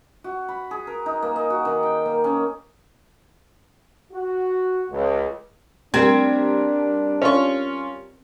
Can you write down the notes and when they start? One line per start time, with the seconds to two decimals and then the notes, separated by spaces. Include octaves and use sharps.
0.24 F#4
0.49 B5
0.71 G#4
0.87 A#4
1.06 D#4
1.22 A#3
1.36 D#5
1.50 F#4
1.65 D#3
1.83 G5
2.05 A#3
2.24 C#4
4.13 F#4
4.91 C#2
5.94 G3 C4 D4 A#4 G#6
7.22 C#4 F4 C#6